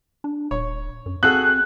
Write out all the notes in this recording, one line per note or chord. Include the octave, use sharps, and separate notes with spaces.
D4
D#1 C#5
F#2
C4 F#4 G#4 A4 F#6